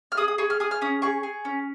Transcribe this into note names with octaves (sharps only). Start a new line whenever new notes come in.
F6
G#4 D#6
D#6
G#4 C#6
F6
G#4 D#6
F6
C#4 D#6
G#4 C#6
G#4
C#4